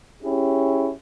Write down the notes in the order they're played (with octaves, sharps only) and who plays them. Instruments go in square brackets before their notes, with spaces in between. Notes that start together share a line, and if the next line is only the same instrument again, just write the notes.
[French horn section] C#4 E4 G4 G#4